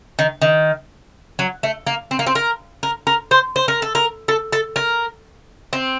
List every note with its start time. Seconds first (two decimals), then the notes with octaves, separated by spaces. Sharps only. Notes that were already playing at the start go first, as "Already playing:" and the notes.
0.19 D#3
0.42 D#3
1.39 F#3
1.63 A3
1.87 A#3
2.11 C4
2.19 A#3
2.27 C4
2.35 A#4
2.83 A#4
3.07 A#4
3.31 C5
3.56 C5
3.68 A#4
3.82 A4
3.95 A#4
4.28 A4
4.53 A4
4.76 A#4
5.73 C4